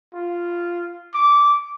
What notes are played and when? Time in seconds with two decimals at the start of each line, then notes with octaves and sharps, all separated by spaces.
0.14 F4
1.14 D6